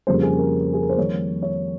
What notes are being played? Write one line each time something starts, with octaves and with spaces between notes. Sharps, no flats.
F2 C#3 G3 A#3 C5
G#4
A#4
G#4
A#4
C5
F2 D#3 G3 A#3 C#5
C#5